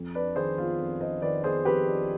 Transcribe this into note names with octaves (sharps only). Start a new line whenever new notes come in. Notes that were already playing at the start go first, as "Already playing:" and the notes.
Already playing: F2
D4 B4 D5
D#3 G#4 C5
B3 F4
F2
D4 C5 D#5
D#3 B4 D5
B3 G#4 C5
F2 G4 B4
D4